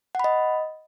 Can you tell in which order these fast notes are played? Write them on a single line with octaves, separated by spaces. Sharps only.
F#5 B5 D#5